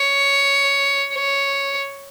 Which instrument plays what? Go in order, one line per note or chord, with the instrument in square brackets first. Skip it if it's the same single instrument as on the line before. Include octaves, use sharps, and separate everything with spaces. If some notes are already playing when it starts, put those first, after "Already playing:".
Already playing: [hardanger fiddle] C#5
C#5